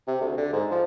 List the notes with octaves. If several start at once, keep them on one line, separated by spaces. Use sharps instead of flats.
C3
D2
D3
G#2
F3